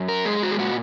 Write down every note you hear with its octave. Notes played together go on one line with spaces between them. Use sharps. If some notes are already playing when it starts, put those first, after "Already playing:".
Already playing: F#2
A#4
G#3 G#4
F#4
G#4
A#2 F#4